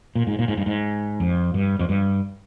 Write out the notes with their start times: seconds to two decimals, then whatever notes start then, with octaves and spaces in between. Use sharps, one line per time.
0.15 A#2
0.27 G#2
0.39 A#2
0.48 G#2
0.57 G2
0.66 G#2
1.20 F2
1.54 G2
1.79 F2
1.89 G2